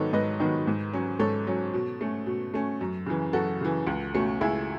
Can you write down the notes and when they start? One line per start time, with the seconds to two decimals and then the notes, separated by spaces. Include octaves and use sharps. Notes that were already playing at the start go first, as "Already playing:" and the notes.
Already playing: G#2 D#3 F#3 B3 D#4 A4 C#5
0.13 G#2 B4 D#5
0.39 D#3 F#3 B3 D#4
0.67 G#2
0.93 F#3 C#4
1.19 G#2 A4 C#5
1.47 F#3 C#4
1.73 B2
2.01 A3 C#4
2.26 B2
2.54 A3 C#4
2.81 F#2
3.06 C#3 E3
3.33 F#2 F#4 A4
3.61 C#3 E3
3.87 C#2
4.14 B2 A3 C#4
4.41 C#2 E4 G#4